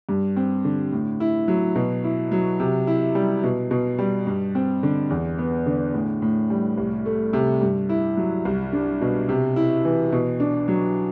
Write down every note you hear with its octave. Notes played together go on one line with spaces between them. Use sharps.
G2
C4
D3
A2
E4
F#3
B2
E4
F#3
C3
E4
G3
B2
B2
G3
G2
C4
D3
E2
B3
D3
A2
A2
G3
C2
A3
C3
G2
E4
F#3
C2
D4
B2
C3
E4
E3
B2
D4
F#3